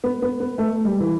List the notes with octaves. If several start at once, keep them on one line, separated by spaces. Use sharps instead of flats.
B3
B3
B3
A3
G3
E3